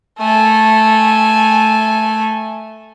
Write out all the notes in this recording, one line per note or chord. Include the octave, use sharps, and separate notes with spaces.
A3 G#5